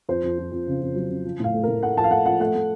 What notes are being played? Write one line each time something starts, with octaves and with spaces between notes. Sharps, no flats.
F2 C5
F2
F2
F2
C#3
F2
F#3
C#3
F3
A2 F5
A3
A2 A#4
A3 F#5
F3 A5
F5
A3 F#5
F3 F#5
A3 F#5
A3